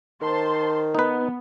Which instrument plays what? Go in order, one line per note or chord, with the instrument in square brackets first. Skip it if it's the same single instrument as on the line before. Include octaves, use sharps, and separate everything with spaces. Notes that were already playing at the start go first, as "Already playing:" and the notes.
[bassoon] D#3 [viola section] C5 A5 C6
[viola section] B3 [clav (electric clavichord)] D#4 B4